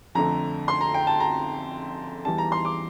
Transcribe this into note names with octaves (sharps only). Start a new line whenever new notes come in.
F2 D3 A3 A#5
C6
A#5
G5
A5
A#5
E2 E3 G3 A5
A#5
C6
D6